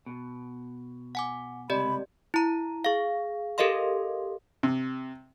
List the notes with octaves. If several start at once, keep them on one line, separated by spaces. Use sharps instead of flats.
B2
F#5 G#5 D6
C#2 G2 C3 G4 D5 D#5 B5
E4 A#5
G#4 F5
G4 A4 A#4 D#5 F5 C6
C3